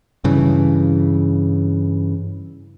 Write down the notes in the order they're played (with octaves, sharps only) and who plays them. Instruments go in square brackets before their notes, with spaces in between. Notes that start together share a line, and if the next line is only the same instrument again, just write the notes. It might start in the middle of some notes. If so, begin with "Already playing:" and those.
[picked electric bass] G2 C#3 E3